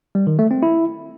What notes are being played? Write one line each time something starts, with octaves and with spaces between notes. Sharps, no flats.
G3
D#3
A3
C4
E4